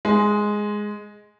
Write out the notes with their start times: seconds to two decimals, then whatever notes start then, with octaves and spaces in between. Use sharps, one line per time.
0.05 G#3